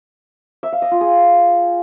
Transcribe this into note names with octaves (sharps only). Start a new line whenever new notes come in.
E5
F5
D#5
F4
G#4